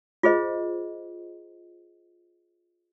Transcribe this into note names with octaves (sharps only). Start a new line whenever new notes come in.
F4 G#4 C5 D#5